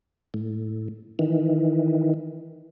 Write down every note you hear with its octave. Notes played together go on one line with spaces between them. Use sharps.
A2
D#3 E3